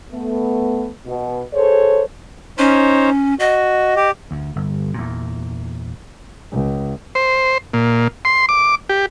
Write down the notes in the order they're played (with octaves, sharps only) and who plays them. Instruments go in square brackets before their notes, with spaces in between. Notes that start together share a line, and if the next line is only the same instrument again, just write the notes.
[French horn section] A3 B3
B2
G#4 A4 C5 C#5
[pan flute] C#4 [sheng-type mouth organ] D#4 C5 C#5
[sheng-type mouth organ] F#4 [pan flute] D#5
[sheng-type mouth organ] G4
[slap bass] D2
G1
E2 A#2
[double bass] C#2
[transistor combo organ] C5
A#2
C6
D6
G4